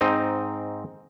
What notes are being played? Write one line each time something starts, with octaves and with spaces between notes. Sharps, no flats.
G#2 C4 D#4 D#5